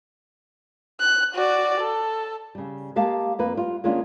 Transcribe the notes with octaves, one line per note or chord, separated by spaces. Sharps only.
F#6
F#4 D5
A4
C#3 G3
G#3 A#3 G4 F5 A5
F2 A#3 B4
G3 F4
D#3 G#3 A#3 C#4 D4 F4